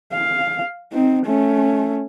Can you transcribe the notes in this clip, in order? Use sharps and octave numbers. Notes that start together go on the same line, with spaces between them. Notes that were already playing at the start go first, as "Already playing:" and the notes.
F5
C4 D#4
A3 C#4